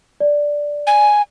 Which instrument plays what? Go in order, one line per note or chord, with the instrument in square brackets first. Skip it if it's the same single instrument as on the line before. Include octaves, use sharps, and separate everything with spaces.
[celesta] D5
[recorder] G#5